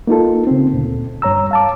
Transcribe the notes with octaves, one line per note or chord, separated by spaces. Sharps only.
A#3 D#4 F4 A4
C#3 C4
D2 A#2
G2 C#5 A#5 E6
F5 A5 D6